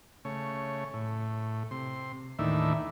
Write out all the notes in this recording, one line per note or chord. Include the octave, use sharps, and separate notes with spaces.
C#3 A3 C#5
A2
C3 C6
D#2 A2 D#3 E3 D4 E5